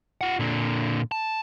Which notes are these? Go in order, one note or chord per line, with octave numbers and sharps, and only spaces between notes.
F4 F#5
A#2 D3
A5